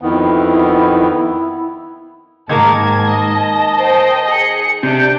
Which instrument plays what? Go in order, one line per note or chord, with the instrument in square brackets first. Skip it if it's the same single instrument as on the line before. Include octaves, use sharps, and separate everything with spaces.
[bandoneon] F2 D#3 B3 [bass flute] E4
[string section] G#2 [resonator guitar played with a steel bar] D#3 A#3 A#4 [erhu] A5 [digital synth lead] G#6
[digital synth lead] D#5 [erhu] A5
[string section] C5 G5 D#6
G#4 C#7
[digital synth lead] C3 [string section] D4 [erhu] G6